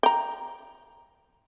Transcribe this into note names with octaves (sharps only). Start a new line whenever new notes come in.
G5 A#5